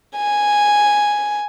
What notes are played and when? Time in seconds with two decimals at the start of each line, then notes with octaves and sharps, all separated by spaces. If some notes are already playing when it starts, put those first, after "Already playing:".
0.17 G#5